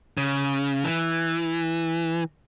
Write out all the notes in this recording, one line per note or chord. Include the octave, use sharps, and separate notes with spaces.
C#3
E3